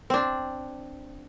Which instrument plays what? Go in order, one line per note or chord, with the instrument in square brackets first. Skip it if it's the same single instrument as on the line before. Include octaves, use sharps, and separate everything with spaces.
[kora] C4 D4